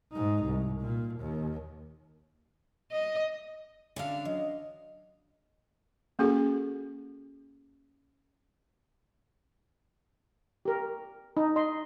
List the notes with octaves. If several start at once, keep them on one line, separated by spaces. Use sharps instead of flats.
G#2 D#4
C2
A#2
D#2
D#5
D3 C#4 D4 E5 F5
F#3 D#5
A#3 C#4 F#4 G#4 A4
G4 A#4
D#4
D#5 C6